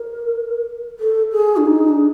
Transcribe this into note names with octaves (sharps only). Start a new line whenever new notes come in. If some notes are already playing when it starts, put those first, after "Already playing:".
Already playing: A#4
A4
G#4
D4
D#4
D4